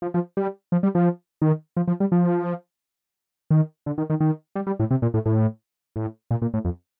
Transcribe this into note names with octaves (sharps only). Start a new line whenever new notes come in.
F3
F3
G3
F3
G3
F3
D#3
F3
F3
G3
F3
D#3
D3
D#3
D#3
D#3
G3
G3
A2
C3
A#2
A2
A2
A2
A#2
A#2
A2
F2